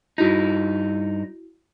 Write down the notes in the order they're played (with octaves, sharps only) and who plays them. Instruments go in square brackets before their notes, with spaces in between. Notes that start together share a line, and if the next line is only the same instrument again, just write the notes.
[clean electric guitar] G2 D#4 [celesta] E4 F#4